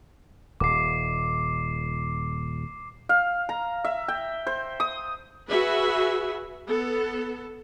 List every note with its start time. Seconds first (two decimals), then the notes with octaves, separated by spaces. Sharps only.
0.60 D#1 D6 C7
3.09 F5
3.49 A#5
3.84 E5
4.08 G5
4.47 C5
4.80 D#6
5.49 F#4 G#4 B4 E5
6.66 B3 A4